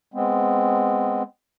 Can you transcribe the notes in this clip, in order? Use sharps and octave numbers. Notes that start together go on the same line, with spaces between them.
G#3 B3 C4